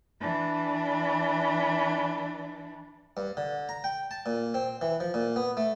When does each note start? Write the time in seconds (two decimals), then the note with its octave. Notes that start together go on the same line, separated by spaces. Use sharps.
0.20 E3 D4
3.17 G2
3.37 D3
3.69 A#5
3.84 G5
4.11 A5
4.26 A#2
4.54 C4
4.81 E3
5.00 F3
5.14 A#2
5.36 B3
5.57 A3